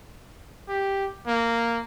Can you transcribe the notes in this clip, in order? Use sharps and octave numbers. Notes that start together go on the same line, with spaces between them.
G4
A#3